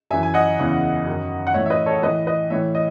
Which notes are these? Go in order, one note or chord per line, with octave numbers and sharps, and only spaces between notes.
F#2 E3 E5 G#5
G#5
D#5 F#5
E2 C#3 E3
F#2 D#3
F#5
A2 E3 C#5 E5
E5
B4 D#5
A4 C#5
A2 E3 B4 D#5
B4 D#5
A2 E3 C#5 E5
D#5